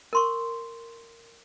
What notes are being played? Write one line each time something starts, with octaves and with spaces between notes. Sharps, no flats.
A#4 C6 C#6